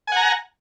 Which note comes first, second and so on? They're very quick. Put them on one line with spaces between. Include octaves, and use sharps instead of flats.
G#5 F#5 A#5